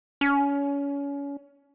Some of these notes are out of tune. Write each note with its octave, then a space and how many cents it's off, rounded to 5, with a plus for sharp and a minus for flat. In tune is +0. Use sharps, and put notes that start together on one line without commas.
C#4 +30